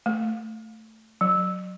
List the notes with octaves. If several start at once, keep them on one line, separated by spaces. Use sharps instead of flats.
A3
F#3